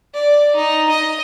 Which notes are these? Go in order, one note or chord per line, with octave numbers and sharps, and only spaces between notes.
D5
D#4
D#5